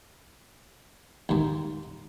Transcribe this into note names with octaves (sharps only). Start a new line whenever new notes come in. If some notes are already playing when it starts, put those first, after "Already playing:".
D#2 G#2